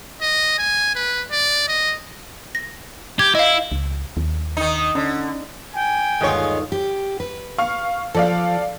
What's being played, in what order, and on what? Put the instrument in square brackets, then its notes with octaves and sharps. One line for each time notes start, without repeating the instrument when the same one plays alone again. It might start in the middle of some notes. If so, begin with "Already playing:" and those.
[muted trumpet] D#5
G#5
B4
D5
D#5
[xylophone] A#6
[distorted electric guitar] G4 [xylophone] G#6
[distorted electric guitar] E4 [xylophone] D#5 F5
[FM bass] C#2
D#2
[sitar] D#3 D#4
[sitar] D3 [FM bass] C#4
[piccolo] G5 [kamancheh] G#5
[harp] G1 D#2 D#6 [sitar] G#3 F4 C#5
[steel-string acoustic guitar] G4
B4
[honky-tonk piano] F5 C#6 F6
[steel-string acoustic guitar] F3 [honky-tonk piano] A4 D5 F5